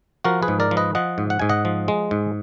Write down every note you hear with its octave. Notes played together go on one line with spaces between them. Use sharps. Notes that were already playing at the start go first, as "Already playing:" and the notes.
F3 F#4 A#4
G#4 B4
G#2
A#4 D5
F3
B4 D#5
F3 D#5 F#5
G#2
F#5
G#2 G#5
D#5 F#5
F3
G#3
G#2